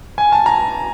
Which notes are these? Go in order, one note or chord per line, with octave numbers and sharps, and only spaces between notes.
G#5
A5
A#5